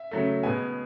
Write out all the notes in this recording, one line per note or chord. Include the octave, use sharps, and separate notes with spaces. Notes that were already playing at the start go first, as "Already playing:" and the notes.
Already playing: E5
C#3 F#3 A3
B2 G#3 B3 G#5